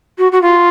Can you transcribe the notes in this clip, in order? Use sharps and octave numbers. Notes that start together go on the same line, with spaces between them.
F#4
F#4
F4